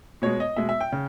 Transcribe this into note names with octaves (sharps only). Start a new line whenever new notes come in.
B2 G#3 C#5
D#5
B2 G#3 E5
E5
G5
C#3